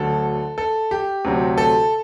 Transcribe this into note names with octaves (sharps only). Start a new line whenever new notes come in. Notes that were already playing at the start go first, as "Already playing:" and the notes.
Already playing: D2 D3 F#3 A4
A4
G4
D2 C3 F#3
A4